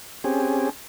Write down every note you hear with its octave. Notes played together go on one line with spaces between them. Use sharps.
C4 C#4 G4 G#4